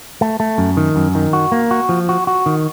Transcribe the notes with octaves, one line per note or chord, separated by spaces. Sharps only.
A3
A3
F#2
D#3
F#2
D#3
F#4
A#3
F#4
F3
F#4
F#4
D#3